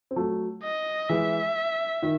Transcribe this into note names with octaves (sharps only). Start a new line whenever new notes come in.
C4
F#3 A3
D#5
E3 G#3 E5
D#3